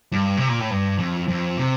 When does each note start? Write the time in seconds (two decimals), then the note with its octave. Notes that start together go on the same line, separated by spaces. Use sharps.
0.12 G2
0.37 C3
0.48 A#2
0.59 A2
0.70 G2
0.98 F2
1.28 F2
1.57 C3